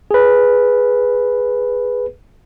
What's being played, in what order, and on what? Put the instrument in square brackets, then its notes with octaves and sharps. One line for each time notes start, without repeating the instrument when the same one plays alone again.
[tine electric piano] G#4 B4